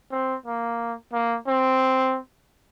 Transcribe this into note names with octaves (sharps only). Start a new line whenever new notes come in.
C4
A#3
A#3
C4